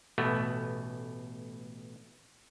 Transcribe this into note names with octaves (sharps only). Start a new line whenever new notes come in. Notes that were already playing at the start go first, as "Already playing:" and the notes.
A1 B2 A3 B3